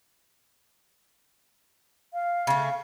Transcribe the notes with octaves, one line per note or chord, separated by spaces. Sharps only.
F5
C#3 A3